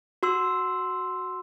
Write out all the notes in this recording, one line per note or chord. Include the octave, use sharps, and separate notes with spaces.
F#4 C6 E6